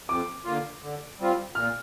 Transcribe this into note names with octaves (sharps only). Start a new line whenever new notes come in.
F2 D6
D3 A#3 F4
D3
G3 C4 F4
A#2 F6